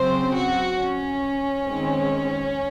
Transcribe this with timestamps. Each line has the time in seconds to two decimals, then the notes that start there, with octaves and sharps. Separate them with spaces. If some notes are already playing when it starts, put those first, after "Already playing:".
Already playing: C#3 F#3 C4 C5
0.36 F#4
0.79 C#4
1.66 D#3 G#3 C4